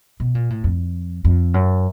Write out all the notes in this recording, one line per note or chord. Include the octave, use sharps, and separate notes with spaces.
B2
A#2
A2
F2
F2
F#2